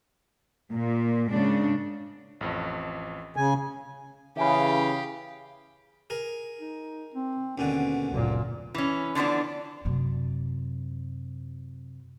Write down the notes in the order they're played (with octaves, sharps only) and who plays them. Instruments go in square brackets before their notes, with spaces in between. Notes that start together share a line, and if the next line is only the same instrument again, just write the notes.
[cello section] A#2
G#2 C#3 D4
[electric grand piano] A1 F2
[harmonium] C#3 G#5
[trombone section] C#3 [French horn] E3 [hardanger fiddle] G4 F5 [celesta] E5 G#5 B5
[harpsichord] G#4 A#4
[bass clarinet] D#4
C4
[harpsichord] D#2 B2 D3 [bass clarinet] C#4
[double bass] F#1 A#2 [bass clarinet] D2
[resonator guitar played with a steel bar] E3 C#4
D3 E3 F3 B3 D4
[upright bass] F#2 C3